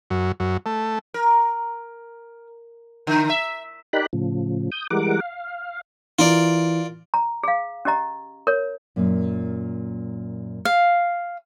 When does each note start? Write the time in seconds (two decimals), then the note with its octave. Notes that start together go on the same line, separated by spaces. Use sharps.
0.11 F#2
0.40 F#2
0.66 A3
1.14 A#4
3.07 D3
3.30 E5
3.93 D#4 G4 A#4 D5 B5 F#6
4.13 A2 C#3 F3
4.72 D#6 G6
4.91 E3 G3 G#3 A#4 F#5 D6
5.20 F5
6.19 E3 F4 A#4 D5
7.14 A#5
7.43 G#4 F5
7.85 C#4 G4 D#5 A#5
8.47 A#4 C#5
8.96 F#2 A#2
10.65 F5